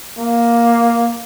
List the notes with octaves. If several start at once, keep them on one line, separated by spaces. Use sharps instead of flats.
A#3